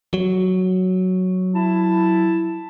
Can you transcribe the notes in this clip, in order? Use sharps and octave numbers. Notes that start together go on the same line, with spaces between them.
F#3
E4 A5